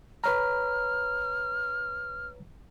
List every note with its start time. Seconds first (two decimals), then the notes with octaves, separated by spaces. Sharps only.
0.24 B4 C#5 A#5 F6